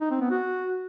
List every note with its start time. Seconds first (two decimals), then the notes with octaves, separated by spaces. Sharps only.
0.01 D#4
0.11 C4
0.21 B3
0.31 F#4